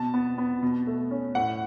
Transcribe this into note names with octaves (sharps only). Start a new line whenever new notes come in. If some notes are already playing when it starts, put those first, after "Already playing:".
Already playing: B2 A5
B3
B3
B2
A3
C#4
A2 F#5